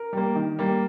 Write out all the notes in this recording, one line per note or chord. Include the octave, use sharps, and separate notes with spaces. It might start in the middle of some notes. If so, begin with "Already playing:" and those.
Already playing: A#4
G3 A#3
D#3
G3 A#3